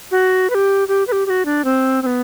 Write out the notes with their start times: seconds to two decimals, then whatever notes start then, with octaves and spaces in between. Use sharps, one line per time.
0.11 F#4
0.50 B4
0.55 G4
0.88 G4
1.07 B4
1.12 G4
1.26 G4
1.30 F#4
1.45 D4
1.65 C4
2.02 C4
2.06 B3